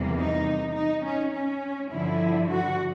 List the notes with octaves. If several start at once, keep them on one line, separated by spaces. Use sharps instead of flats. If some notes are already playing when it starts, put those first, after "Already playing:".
Already playing: E2 C3 E3 G3 A#3
D#4
D#4
C#4
C#4
G2 D3 F3 E4
F#4